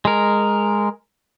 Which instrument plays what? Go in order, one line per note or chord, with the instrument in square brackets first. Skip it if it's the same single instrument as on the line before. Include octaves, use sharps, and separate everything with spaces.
[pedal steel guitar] G#3 A#4